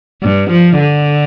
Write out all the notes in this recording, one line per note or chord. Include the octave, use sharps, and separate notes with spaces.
G2
F3
D3